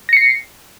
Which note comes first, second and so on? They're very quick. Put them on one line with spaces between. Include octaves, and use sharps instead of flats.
A#6 C#7 C7